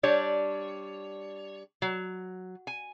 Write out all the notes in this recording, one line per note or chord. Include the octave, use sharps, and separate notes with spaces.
G3 D4 C#5
F#3
G#5